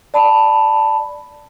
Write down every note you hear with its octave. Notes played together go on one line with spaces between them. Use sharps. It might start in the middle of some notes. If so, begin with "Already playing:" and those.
D5 A5 B5